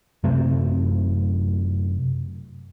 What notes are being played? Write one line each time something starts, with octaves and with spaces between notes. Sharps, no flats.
F#2 C3 A3 C4